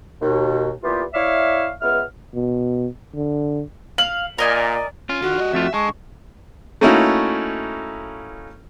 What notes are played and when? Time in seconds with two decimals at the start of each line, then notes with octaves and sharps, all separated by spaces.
0.21 D#2 B2
0.82 A#2 E3 B3 F4 G4
1.13 E4 C#5 D5 E5 F5
1.81 C#2 B3 E5 F6
2.34 B2
3.15 D3
3.98 F5 F#7
4.38 A#2 A#4 D5 D#5 G#5
5.09 C#4 F4
5.22 D3 D#3 F#4
5.37 G3 D#5
5.53 F2 A3 F4 E5
5.74 D3 G#3 A5 C#6
6.81 A3 A#3 C#4 D#4 E4 F#4